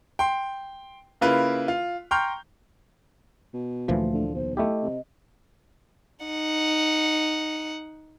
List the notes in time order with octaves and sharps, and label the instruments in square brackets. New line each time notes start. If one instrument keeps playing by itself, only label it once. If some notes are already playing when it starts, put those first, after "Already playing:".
[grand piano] G5 C6
C#3 A#3 E4 F4 B4
F4
G5 A#5 C6 C#6 F6 G6
[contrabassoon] B2
[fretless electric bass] D2 A#2 E3 [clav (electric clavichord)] F3 [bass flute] A3
[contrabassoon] D3
[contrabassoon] B1 [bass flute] C5
[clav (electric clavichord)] A3 E4 G4 [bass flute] D#5
[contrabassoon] C3
[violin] D#4 F#5